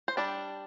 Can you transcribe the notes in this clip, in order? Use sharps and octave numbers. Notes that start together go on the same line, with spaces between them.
C5
G3 D4 D5